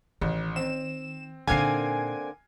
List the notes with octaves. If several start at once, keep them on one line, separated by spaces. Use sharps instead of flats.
A1 D#3
C4 E7
A#2 D3 A#3 C4 D#4 G#5 G#6 C7